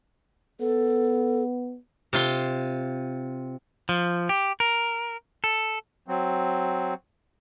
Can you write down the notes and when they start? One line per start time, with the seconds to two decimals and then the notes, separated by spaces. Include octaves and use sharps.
0.60 B3 A4
2.13 C3 F4 C6
3.89 F3
4.29 G4
4.60 A#4
5.44 A4
6.08 F#3 C4